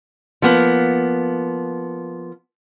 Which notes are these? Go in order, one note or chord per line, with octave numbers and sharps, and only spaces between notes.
F3 A#3 B3